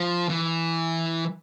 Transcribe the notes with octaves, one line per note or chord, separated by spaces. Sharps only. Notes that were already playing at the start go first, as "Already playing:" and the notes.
Already playing: F3
E3